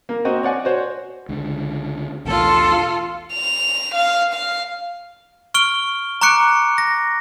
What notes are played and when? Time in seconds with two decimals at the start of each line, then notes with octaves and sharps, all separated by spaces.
0.09 A#3
0.25 C4 F#4 D#5
0.43 C#5 D5 F#5 G#5
0.65 F#4 C5 C#5
1.29 C#2 D3
2.25 B1 E2 A2 F4 A4
3.34 F7
3.95 F5
4.34 F5
5.54 C#6 F6 D7 G7
6.21 A#5 C#6 D6 F#6 C#7 D7
6.78 A#6